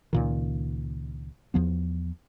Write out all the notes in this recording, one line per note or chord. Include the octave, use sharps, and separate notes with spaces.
C#2 A#2 D#3
E2 F3 B3